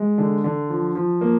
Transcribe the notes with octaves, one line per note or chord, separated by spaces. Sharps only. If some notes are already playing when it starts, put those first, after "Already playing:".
Already playing: G#3
D3
D3
F3
F3
A#3